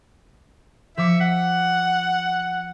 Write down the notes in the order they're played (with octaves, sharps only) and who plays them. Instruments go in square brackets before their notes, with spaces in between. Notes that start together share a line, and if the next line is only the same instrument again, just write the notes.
[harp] F3 D6 C#7 [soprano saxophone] E5
[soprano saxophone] F#5